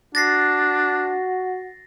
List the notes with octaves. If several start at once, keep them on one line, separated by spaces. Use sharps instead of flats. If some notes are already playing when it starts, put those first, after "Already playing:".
D4 F#4 A6 A#6 C7